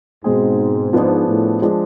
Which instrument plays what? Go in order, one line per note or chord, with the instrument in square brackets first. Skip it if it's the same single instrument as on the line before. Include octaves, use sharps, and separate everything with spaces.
[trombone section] G#2 [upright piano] B2 G#3 C4 G#4
[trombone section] G#2 [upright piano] F3 B3 D4 G#4
[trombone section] A2
[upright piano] F3 G#3 D4 G#4